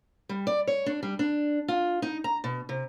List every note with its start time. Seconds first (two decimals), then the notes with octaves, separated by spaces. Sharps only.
0.29 G3
0.47 D5
0.67 C#5
0.86 D4
1.03 G3
1.19 D4
1.68 F4
2.02 D#4
2.24 A#5
2.44 B2
2.69 C3